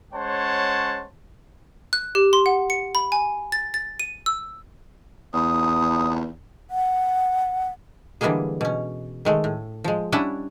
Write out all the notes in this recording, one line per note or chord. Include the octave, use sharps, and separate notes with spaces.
G#3 C#4 C5 C#5 F#5 A5
F#6
G4
C6
F#5
C#7
B5
G#5
A6
A6
D#7
E6
E2 D#6
F#5
D3 E3 G3 G#3 A#3 G#4
B2 C#4
D#3 G#3 A3
A2
F3 G#3
G3 C#4 D4 E4 F#5 A5